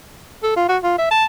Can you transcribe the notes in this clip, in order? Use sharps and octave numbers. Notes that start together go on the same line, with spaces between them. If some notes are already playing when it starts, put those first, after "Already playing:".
A4
F4
F#4
F4
E5
A5